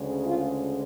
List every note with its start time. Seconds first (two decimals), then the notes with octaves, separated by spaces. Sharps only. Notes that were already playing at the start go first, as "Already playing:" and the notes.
Already playing: D2 C#3 G#3
0.26 F4